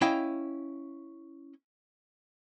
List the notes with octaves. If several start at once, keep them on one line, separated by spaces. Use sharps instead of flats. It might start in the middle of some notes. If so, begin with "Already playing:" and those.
C#4 E4 D#5 F5 G5